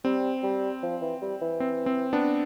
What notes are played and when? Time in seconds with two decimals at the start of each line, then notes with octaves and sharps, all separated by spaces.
0.04 G3 C4
0.43 G3
0.83 F3
1.02 E3
1.22 G3
1.41 E3
1.60 C4
1.86 C4
2.13 B3 D4